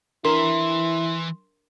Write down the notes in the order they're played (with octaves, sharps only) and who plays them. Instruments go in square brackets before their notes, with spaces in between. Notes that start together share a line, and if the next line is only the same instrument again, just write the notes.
[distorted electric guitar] E3 E5 [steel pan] D4 A#4 [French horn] E4 [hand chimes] C6